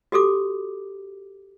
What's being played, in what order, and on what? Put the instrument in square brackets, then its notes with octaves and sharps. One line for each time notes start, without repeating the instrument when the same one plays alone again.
[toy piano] F#4 G4 A4 D6